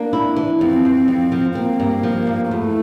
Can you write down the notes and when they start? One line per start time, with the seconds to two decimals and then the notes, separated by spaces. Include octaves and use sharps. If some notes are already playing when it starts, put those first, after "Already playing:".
Already playing: A#3 D4
0.13 E4
0.36 E3
0.61 F2 C4
0.85 F2
1.08 F2
1.32 F3
1.55 A#3 C4
1.80 G2
2.03 F3
2.27 G2
2.51 E2 A3